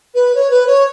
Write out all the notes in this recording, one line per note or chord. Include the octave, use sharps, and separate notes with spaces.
B4
C#5
B4
C#5